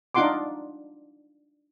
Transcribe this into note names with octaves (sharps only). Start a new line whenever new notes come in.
D4 D#4 F4 F#5 C6 D6